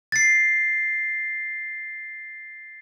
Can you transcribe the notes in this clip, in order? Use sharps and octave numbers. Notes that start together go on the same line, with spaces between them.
A6 C7